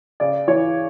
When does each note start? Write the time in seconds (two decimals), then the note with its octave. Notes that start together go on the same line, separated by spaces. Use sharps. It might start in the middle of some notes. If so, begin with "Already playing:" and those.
0.20 C#3 D5
0.48 E3 C#5